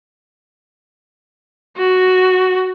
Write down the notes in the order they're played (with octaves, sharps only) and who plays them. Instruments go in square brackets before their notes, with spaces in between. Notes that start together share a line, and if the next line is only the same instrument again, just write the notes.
[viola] F#4